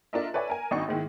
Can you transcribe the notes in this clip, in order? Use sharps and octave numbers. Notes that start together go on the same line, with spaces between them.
D4 F4 A4 A#4 D#5 E5
A4 B4 C#5 D5 E5 G#5
A#4 G#5
G#1 D4 D#4 F#4 C#6
G#2 D#3 G#3 E4